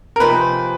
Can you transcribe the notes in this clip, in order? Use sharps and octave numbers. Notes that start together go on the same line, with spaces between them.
A#4
C3 F3 A#3 D#4 G#4 B4